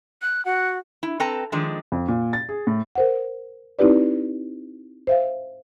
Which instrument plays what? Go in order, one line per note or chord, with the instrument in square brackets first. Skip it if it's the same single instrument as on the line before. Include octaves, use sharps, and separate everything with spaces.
[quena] F#6
[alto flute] F#4 [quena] F#5
[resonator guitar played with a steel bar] E4
C4 A4 B4 G5 A5 A#5
D#3 F3 G#3 D4
[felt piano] F2
A#2
A6
G#4
A2
[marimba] A#4 C5 F#5
C4 D#4 E4 G4 B4 D5
C5 E5 F5